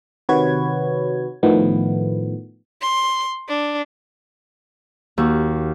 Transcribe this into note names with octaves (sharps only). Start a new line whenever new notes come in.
C3 D#3 F#4 B4 C#5 G#6
A2 D#3 F3 A3 B3
C6
D4
D#2 F#4